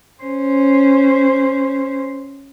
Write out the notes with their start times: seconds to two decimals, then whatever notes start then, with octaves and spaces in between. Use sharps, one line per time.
0.23 C#4 C5